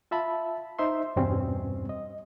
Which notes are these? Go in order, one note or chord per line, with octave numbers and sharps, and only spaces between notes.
F4 E5 A5 B5
D#4 C5 E5 C6
E2 G2 B2 G3 C4 C#4
D#5